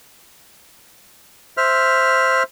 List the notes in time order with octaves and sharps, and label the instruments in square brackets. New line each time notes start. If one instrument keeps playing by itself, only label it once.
[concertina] C5 E5 F6